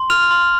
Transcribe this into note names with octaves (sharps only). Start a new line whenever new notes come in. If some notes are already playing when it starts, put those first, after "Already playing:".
Already playing: C6
F6 F7
C6